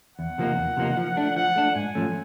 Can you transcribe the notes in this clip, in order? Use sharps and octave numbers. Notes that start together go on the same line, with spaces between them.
E2 F#5
C3 F3 A#3 D#4
E2
C3 F3 A#3 D#4
F3
A3 D4
F3 F#5
A3 D4
G#2 G#5
F3 A3 C#4